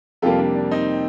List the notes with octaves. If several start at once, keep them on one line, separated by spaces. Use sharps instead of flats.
F2 C3 G3 A#3 F4 A4
D4
D4
C4 D#4